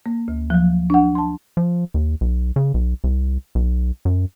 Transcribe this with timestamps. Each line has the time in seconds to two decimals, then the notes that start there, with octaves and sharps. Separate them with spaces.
0.06 A#3
0.28 D2
0.50 F3 F#3
0.90 D4 F#5
1.15 A5 C6
1.57 F3
1.94 D#2
2.21 B1
2.56 C#3
2.74 B1
3.04 C2
3.55 B1
4.05 F#2